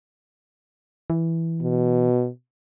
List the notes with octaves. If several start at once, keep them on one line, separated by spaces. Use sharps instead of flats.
E3
B2